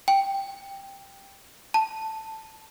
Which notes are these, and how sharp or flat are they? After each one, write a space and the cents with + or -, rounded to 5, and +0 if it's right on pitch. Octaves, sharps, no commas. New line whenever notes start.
G5 +5
A5 +5